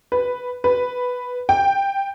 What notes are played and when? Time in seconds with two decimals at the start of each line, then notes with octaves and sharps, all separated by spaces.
0.12 B4
0.64 B4
1.49 G5